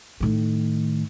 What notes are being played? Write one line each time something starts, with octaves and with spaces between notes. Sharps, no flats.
A2 D#3